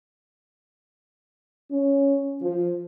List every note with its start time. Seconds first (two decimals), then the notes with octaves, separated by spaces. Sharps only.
1.72 C#4
2.43 F3